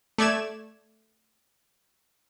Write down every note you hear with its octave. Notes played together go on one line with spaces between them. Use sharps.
A3 D5 G#6 E7